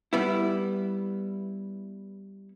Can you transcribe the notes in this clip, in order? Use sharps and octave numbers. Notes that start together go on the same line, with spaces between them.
G3 B3 E4